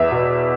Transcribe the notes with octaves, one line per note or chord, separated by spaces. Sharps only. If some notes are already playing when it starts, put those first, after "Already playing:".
Already playing: E2 E5
B2